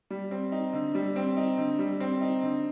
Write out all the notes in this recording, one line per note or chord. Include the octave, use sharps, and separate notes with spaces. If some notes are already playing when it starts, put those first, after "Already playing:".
G3
C4
D#4
D3
G3
C4
D#4
D3
G3
C4
D#4
D3